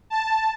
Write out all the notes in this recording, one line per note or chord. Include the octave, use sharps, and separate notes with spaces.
A5